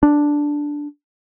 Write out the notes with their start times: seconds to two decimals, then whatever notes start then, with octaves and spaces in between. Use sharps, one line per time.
0.03 D4